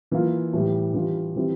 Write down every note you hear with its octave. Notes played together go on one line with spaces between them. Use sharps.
E3 A#3 F4
A2 E3 G3
E3 G3 D4 F4
E3 G3 C4 E4